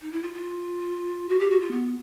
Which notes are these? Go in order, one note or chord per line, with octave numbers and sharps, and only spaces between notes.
D#4
E4
F4
F4
F#4
G4
F#4
F4
B3